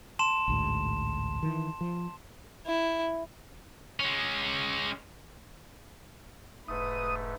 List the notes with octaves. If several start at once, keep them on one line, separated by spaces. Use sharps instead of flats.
A5 C6 E7
A1 D2 G#2
D#3 E3
F3
E4
G#3 C#4
E1 G#2 A3 B4 D#6